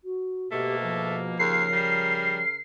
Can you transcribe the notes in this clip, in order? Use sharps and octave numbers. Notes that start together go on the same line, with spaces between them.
F#4
G#2 B2 A3 A#3 G4
F3
D#2 C#3 A#4 C7
G3